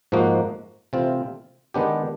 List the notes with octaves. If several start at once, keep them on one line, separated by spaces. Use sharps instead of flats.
G#2 F3 A#3 D#4 F#4
C3 E3 A3 C4 F4
D#3 G#3 B3 D4 G4